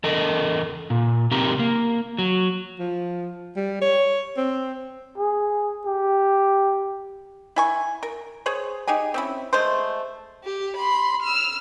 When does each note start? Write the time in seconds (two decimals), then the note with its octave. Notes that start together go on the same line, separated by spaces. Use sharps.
0.04 E2 A4 A#4 D#5
0.90 A#2
1.31 C3 C4 D#4 G4 A#4
1.59 A#3
2.18 F#3
2.79 F3
3.56 G3
3.81 C#5
4.37 C4
5.18 G#4
5.86 G4
7.56 E4 G#5 C#6
8.03 A#4
8.46 G#4 C5 C#5
8.88 D#4 G4 G#4 G#5
9.14 C4 C#4 E4
9.53 G#3 A3 C5
10.44 G4
10.77 B5 C6
11.23 E6 F6